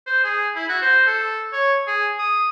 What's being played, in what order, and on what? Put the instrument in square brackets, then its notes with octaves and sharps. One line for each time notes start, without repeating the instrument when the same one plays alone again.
[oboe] C5
G#4
E4
F#4
C5
A4
C#5
G#4
D#6